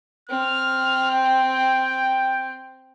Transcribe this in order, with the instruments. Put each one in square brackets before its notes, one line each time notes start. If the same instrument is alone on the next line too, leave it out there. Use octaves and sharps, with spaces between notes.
[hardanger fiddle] C4 [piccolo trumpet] F6
[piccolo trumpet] G5